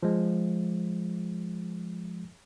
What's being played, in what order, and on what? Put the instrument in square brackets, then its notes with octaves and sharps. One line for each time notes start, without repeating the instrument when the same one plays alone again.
[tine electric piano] F3 G#3